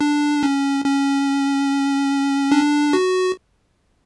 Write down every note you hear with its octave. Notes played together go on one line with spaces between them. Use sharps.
D4
C#4
C#4
D4
F#4